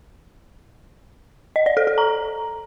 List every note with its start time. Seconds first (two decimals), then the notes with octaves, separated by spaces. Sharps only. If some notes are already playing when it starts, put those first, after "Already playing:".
1.56 D#5
1.66 D5
1.77 A4
1.87 A4
1.98 A#5